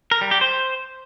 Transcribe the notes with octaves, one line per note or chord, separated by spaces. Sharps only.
A#4
G3
G4
C5